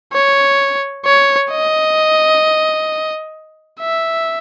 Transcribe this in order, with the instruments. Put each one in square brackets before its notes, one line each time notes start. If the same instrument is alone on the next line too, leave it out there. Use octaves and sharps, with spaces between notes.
[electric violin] C#5
C#5
D#5
E5